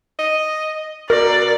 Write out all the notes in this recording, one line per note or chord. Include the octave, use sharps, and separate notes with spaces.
D#5
B2 A#4 D5